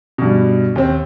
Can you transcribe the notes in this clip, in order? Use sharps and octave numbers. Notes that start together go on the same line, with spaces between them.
G2 B2
D#2 C4